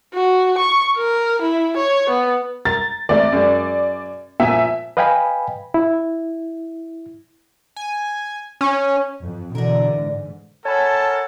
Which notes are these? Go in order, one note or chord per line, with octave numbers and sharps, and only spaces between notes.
F#4
C#6
A#4
E4
C#5
B3
A#4 A6
G#1 A3 D5
F#2 G#3
A#2 F3 E5 G#5
B4 D#5 F5 G5 G#5 B5
E4
G#5
C#4
F2
B2 D3 E3 A#4 D5
G#2
A4 A#4 C#5 F#5 G#5 A5 B5